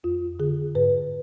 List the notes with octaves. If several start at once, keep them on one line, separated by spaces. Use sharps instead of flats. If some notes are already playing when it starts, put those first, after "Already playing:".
F2 F4
D3 G#4
G#2 B4